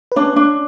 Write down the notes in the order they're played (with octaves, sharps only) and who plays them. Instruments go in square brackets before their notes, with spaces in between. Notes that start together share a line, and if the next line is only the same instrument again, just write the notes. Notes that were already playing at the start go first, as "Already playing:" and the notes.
[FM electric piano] B4
[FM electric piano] C#4 C#5 [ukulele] D4
[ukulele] D4